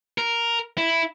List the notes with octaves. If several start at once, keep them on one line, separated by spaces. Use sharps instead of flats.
A#4
E4